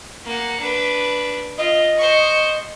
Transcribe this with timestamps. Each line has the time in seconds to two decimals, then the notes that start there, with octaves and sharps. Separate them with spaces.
0.25 A#3 F#5
0.60 D4 B4
1.58 F4 D#5
1.97 C5 C#6